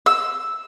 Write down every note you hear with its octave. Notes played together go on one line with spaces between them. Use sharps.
E6